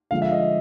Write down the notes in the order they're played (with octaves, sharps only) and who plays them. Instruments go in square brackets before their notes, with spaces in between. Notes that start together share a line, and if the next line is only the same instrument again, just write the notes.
[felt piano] D3 F3 G#3 [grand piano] F5
[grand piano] E5
D#5